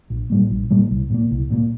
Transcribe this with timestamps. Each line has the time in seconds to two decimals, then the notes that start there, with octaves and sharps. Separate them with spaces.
0.10 A#1
0.30 A#2 G3 A#3
0.50 A#1
0.71 A#2 G3 A#3
0.91 C2
1.10 A#2 G3 A#3
1.31 C2
1.50 A#2 G3 A#3